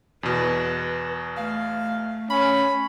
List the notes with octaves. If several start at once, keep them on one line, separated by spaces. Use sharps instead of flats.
E2 B2 B4
A3 F5
C#4 B5